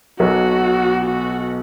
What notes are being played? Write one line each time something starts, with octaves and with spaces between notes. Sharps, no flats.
B1 B2 F#3 F#4
F#4